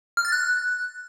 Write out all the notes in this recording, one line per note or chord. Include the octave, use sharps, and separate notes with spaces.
F6
A6
F#6